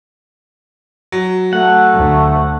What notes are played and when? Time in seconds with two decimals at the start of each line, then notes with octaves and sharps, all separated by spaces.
1.12 F#3
1.53 A3 F#5
1.95 D2